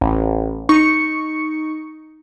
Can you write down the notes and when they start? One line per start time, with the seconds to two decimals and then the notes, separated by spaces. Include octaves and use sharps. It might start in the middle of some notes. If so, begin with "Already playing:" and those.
0.01 A1
0.69 D#4 C#6 C#7